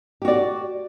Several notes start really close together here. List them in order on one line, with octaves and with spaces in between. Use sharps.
G4 F#4 D5